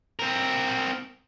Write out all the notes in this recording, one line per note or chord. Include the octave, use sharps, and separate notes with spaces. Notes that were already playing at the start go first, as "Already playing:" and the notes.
C4 A#4